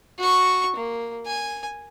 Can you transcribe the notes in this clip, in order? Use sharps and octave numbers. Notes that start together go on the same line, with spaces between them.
F#4 C#6
A#3
G#5